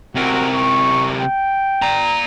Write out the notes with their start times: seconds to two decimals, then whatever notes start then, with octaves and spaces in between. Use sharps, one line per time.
0.15 C3 F#4 A#4
0.53 C#6
1.18 G5
1.82 D5 A#5